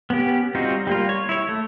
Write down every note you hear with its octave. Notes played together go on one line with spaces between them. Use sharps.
B3 C#4 G4
G3 C4 D#4 F4 F#4
G3 A#3 F4
C#5
E4 C#5
A3